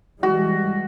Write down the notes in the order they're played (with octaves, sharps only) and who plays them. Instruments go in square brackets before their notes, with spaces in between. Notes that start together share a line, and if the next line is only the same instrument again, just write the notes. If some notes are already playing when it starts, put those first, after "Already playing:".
[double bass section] E3 G3 G#3 [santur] F#4